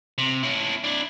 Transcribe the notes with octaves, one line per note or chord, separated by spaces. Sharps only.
C3
C#4 E4
D4 E4